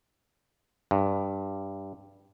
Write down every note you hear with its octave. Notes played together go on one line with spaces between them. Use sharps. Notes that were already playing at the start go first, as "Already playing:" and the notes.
G2